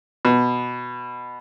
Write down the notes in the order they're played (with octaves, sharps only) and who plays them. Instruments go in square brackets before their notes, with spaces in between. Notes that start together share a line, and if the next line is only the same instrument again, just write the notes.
[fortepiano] B2